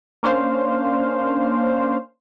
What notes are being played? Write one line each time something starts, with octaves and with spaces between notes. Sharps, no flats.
A#3 C#4 D4 C5 F5